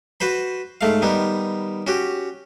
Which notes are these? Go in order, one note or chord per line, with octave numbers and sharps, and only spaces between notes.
F#4 B4 C5 B5
G#2 A3 F5
D#3 G3 B3 D#4
C#4 F#4 G4